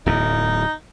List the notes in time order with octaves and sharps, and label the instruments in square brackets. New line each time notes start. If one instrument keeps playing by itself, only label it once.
[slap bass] D1 E2 A2 [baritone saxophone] D#4